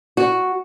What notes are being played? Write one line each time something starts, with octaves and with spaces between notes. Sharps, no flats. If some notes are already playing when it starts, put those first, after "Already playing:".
F#4